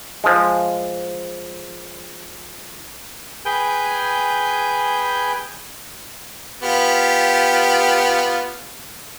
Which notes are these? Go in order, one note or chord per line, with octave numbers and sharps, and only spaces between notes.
F3 G#3
G#4 B4 G5 G#5 G6
B3 F4 G4